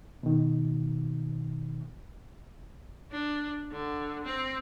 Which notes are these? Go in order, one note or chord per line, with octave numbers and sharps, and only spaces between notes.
B2 D#3
D4
D3
C4